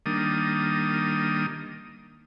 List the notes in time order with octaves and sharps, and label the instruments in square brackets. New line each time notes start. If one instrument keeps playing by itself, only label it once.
[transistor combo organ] D#3 G3 A#3 D4 D#6